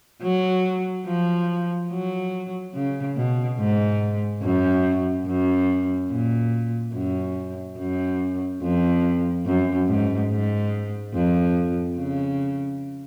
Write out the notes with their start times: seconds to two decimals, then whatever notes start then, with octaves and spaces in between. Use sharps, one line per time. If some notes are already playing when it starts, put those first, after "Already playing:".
0.22 F#3
1.06 F3
1.91 F#3
2.74 C#3
3.16 B2
3.59 G#2
4.43 F#2
5.27 F#2
6.10 A#2
6.94 F#2
7.78 F#2
8.62 F2
9.46 F#2
9.88 G#2
10.31 G#2
11.14 F2
11.99 C#3